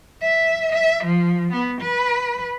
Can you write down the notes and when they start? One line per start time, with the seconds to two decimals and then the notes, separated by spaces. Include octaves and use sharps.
0.22 E5
0.72 E5
1.04 F3
1.52 B3
1.81 B4